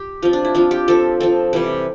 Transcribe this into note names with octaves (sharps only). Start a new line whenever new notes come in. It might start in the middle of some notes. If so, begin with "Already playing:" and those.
Already playing: G4
F3 C4 F4
D4
E4
F3 C4 F4
G4
F3 C4 A4
F3 C4 A4
C3 E3 G3